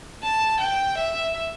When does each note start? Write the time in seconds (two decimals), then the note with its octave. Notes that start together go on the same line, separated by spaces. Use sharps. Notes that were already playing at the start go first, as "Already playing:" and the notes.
0.23 A5
0.60 G5
0.98 E5